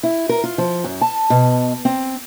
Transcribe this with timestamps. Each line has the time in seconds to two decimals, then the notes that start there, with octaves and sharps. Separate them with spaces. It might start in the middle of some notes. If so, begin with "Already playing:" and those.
0.03 E4
0.29 A#4
0.44 F4
0.58 F3
0.84 F#2
1.01 A5
1.30 B2
1.85 C4